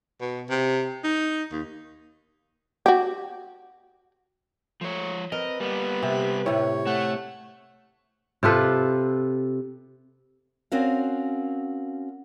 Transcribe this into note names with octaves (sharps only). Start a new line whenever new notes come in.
B2
C3
D#4
D#2
F#4 G4
F3 A3 C#5
C4 A#4 B4 D#5
G3 A#3 B3
C3
A2 C3 C#5
A3 F#5
C3 F4 A4 B4
C4 C#4 F#4 A#4 F5